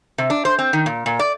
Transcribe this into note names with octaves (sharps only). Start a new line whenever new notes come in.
C3
D4
C5
C4
D#3
A#2
A#2
D5